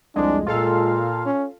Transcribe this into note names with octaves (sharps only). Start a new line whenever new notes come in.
C2 F2 G#3 D4
A#2 G#3 F4 A4 F5
C#4